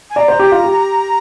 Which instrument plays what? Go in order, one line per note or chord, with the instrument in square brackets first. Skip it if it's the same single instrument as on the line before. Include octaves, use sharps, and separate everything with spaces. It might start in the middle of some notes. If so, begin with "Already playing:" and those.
[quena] G#5
[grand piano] D5 [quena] A#5
[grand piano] C5
G4
F4
G4